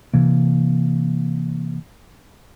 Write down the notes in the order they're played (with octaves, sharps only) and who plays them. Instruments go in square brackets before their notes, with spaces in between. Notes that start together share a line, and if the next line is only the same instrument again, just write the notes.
[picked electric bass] C3 E3 A#3